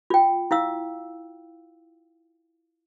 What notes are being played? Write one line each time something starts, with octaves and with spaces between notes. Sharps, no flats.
F4 G5
E4 F5 E6